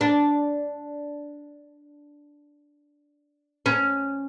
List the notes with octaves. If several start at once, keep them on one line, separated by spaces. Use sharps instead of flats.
D4
C#4